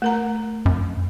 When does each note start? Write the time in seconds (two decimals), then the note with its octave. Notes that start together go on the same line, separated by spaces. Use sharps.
0.02 A3 A#4 A#5
0.65 F#2